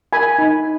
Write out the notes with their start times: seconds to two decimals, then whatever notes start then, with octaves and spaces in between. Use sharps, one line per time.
0.13 A#4 G#5 B5
0.38 D#4